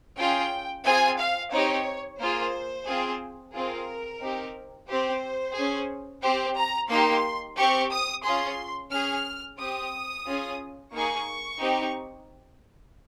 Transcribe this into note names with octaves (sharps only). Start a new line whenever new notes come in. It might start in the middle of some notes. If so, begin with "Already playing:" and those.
C#4 F4 G#4 G5
C4 F4 G#4 G#5
F5
C4 D#4 G4 C#5
A#3 F4 G#4 C5
C4 F4 G#4
C4 F4 G#4 A#4
C4 D#4 G4
C4 G4 C5
C#4 G#4
C4 G4 C5
A#5
A#3 D#4 G4 C6
C4 G4 C#6
D#6
C#4 F4 G#4 C6
C#4 G#4 F6
C4 G4 D#6
C#4 F4 G#4
A#3 D#4 G#4 C#6
C4 D#4 G4